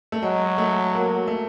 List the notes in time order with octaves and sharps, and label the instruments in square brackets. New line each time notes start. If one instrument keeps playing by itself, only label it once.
[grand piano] A3
[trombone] F#3 [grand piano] G#3
[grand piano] A3
A#3
A3